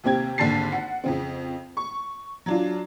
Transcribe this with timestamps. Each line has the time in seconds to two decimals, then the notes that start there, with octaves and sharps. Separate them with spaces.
0.04 D#2 C3 C4 G4 G#6
0.38 G#1 D#2 D3 A5 A6 C7
0.72 F#5
1.04 F2 C#3 C4
1.77 C#6
2.46 F#3 D4 F4